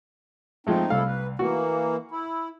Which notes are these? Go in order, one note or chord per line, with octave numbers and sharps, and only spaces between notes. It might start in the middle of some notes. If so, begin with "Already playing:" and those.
F3 G#3 A3 C4 D#4
C2 F3 E4 A4 F5
B4
E3 A#3 F#4
E4